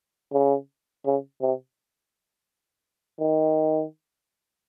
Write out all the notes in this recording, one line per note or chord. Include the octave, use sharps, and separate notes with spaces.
C#3
C#3
C3
D#3